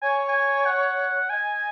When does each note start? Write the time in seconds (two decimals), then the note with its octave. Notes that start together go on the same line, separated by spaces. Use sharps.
0.02 C#5 G#5
0.28 G#5
0.65 F#5
1.30 D#5 G#5